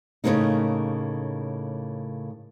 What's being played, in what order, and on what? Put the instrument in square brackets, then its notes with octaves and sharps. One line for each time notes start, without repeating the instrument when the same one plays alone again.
[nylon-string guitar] A2 C#3 F3 F#3 A#3 D#4